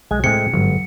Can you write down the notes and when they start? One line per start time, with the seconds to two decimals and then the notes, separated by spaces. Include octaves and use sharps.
0.11 B1 G#3 G#5
0.24 A2 C3 G#3 A3 C4 G#4 C#7
0.53 G1 G#2 F#3